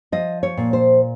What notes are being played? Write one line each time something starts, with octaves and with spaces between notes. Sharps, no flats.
F3 D#5
C#5
A#2
C5